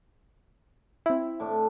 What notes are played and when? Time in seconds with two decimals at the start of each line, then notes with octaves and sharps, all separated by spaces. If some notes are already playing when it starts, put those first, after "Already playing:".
1.06 C4 E4
1.40 A2 D4 A5